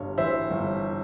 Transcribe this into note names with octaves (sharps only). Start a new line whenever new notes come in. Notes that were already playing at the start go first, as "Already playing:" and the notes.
Already playing: G1 G2 C#5
E3 C5 E5
G1